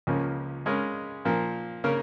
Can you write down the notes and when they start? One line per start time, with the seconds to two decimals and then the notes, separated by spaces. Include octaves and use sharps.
0.07 C#2 C#3 F3 A#3 C#4
0.66 C#3 G#3 C#4 A#4
1.25 A#2 F3 A#3
1.84 C#3 A#3 C#4 A#4